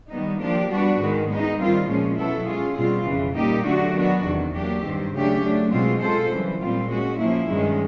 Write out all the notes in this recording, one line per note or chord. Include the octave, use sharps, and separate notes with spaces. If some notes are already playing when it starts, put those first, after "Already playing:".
D#3 G3 B3 D#4
F3 A#3 D4 G4
G3 B3 D4 F#4 B4
G#2 D#3 G#3
G#3 B3 D#4
D#3 G3 C4 F4
A#2 F3 G#3 C#4
B2 F#3 B3 E4 A4
G#3 C#4 F4 G#4
B2 G3 C4 F4
F2 C#3 E3
A#2 G3 A#3 D#4 G4
D3 F#3 A3 D4 F#4
D#3 F#3 B3 D4 F#4
E2 C3 D#3
F#3 A#3 D4 G4
G2 D#3 G3 C4
C#3 F#3 A3 D4 G4
F#3 A3 D4
B2 G#3 C4 F4
G#3 C4 F4 A4 C5
F#2 C#3 E3 G3
A#2 G3 C4 F4
G#3 C#4 F#4
F3 A#3 C#4 E4
G2 D#3 G#3 C#4